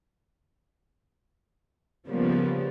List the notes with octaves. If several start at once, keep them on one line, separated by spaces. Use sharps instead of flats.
C#3 F3 G3 A#3 B3